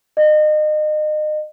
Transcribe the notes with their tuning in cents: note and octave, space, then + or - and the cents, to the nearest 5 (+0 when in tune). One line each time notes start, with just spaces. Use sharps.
D#5 -30